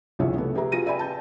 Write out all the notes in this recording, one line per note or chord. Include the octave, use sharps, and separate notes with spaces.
G1 C2 F3 G#4 C#5 E5
C3 A3 B3
G4 G#4 B4 E5 A#5
F4 G#4 A#6 D#7
B4 D5 E5 G5 G#5 B5
A5 G6